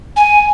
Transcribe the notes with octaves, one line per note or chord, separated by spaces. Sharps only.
G#5